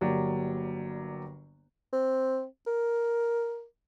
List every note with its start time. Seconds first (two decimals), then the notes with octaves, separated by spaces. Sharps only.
0.01 G1 F#3 A#3 G4 D5
1.93 C4
2.67 A#4